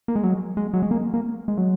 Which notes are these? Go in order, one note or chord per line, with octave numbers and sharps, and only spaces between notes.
A#3
G#3
F#3
G#3
F#3
G#3
A#3
A#3
G#3
F#3